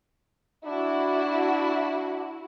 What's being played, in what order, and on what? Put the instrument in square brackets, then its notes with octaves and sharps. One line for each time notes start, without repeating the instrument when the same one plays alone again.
[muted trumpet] D4 [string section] E4 F#4